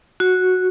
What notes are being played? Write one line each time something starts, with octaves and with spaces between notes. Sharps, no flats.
F#4